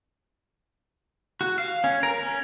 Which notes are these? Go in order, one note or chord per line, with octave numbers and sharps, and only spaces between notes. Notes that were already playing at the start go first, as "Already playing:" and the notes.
F#4
F5
C#4
A#4
C#4